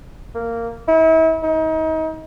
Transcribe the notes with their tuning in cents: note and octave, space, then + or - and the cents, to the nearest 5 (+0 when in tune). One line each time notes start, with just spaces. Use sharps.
A#3 -10
E4 -40
D#4 +35